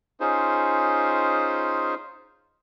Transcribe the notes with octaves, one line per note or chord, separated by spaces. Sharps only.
C#4 D#4 F4 G#4 C5